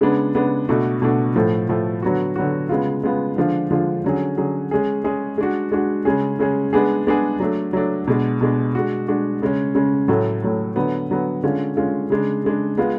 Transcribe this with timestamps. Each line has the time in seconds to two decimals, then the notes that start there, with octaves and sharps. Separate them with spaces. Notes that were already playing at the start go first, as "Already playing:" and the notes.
0.01 C#3 G#3 B3 D4
0.35 C#3 G#3 B3 D4
0.69 B2 A3 D4 F#4
1.02 B2 A3 D4 F#4
1.35 A2 F3 A3
1.69 A2 F3 A3
2.02 D3 F#3 B3 F#4
2.36 D3 F#3 B3 F#4
2.69 C#3 G#3 B3 F4
3.04 C#3 G#3 B3 F4
3.36 D3 F3 G#3 D4 F4
3.71 D3 F3 G#3 D4 F4
4.04 D3 F#3 C#4 G#4
4.38 D3 F#3 C#4 G#4
4.71 G#3 C#4 G#4
5.04 G#3 C#4 G#4
5.38 G#3 D4 F#4
5.72 G#3 D4 F#4
6.05 C#3 G#3 C#4 G#4
6.39 C#3 G#3 C#4 G#4
6.73 G#3 B3 D4 G#4
7.07 G#3 B3 D4 G#4
7.40 F#3 A3 D4
7.73 F#3 A3 D4
8.07 B2 G#3 D4
8.41 B2 G#3 D4
8.75 G#3 D4 F#4
9.08 G#3 D4 F#4
9.42 C#3 G#3 C#4
9.75 C#3 G#3 C#4
10.08 A2 F#3 A3
10.42 A2 F#3 A3
10.76 D3 F#3 B3
11.10 D3 F#3 B3
11.43 D3 G#3 C#4 F4
11.77 D3 G#3 C#4 F4
12.10 C#3 G#3 D4
12.44 C#3 G#3 D4
12.78 G#3 B3 F4